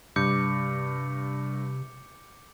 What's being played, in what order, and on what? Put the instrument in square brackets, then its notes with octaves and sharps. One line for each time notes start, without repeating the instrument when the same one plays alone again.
[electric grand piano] G2 [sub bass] C3 [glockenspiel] D6 G6 C#7